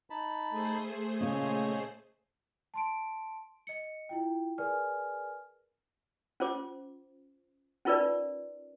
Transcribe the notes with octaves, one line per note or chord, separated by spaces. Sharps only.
D#4 A5 B5
A3 G#4 C5
A#2 C#3 C#5 D#5 G#5
A5 C6 D7
D#5 C#7
E4 F4 G5
G#4 A#4 B4 D5 G#5 F6
C#4 F4 C5 D6
C#4 D#4 F4 A#4 B4 D5